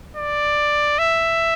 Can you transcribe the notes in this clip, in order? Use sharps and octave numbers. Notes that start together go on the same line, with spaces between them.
D5
E5